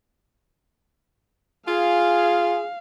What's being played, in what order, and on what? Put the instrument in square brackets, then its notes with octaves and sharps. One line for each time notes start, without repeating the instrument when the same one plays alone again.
[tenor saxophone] F4 [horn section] G#4 [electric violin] F5